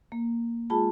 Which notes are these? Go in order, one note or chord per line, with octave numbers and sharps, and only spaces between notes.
A#3
G#3 F4 G#4 A5 B5